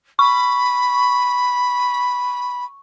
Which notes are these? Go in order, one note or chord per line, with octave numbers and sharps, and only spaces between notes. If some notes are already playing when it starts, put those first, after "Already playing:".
B5 C#6